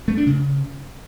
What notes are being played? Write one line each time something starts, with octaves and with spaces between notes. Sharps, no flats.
A3
D4
C#3